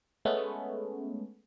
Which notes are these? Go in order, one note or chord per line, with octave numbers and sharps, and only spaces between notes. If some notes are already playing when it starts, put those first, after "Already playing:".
G#3 A3 B3 C#4